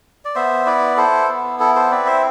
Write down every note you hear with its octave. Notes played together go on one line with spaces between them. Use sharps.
D5
B3 C5 E5
E4 B4 D5
E4 A4 C5
B3
E4 A4
A4 C5
C4 B4 D5
C5 E5